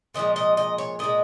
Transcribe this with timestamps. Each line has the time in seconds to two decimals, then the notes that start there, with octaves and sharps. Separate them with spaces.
0.14 A#2 F3 G#3 D#5
0.36 D#5
0.57 D#5
0.78 C#5
0.99 A#2 G#3 D#5